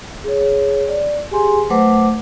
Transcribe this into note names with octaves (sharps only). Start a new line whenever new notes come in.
G#4 C#5
D5
G4 G#4 G#5 C6
F#3 A3 B4 C5 F#5 D6